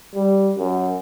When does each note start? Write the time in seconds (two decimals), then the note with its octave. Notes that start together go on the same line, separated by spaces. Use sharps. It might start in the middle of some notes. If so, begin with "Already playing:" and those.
0.15 G3
0.58 F#2